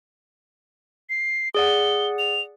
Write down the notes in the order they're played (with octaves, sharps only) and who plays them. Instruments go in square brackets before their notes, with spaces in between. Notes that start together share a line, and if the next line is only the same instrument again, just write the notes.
[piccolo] C7
[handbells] G#4 D5 F#5 [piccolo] G7
[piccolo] F7